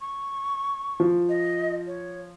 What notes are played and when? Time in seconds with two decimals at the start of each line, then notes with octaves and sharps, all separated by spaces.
0.01 C#6
1.00 F3
1.29 D#5
1.87 C#5